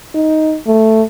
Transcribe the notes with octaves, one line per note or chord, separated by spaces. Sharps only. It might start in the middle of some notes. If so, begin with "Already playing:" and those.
D#4
A3